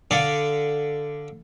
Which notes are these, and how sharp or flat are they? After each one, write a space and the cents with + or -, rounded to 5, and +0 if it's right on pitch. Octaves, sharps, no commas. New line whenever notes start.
D3 +0 D5 +0 F5 +0